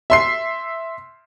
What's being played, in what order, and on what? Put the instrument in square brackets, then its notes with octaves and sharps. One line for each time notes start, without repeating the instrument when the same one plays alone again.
[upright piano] E5 C6 C7